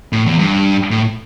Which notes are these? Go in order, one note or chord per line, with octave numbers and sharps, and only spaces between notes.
A2
E2
G2
A2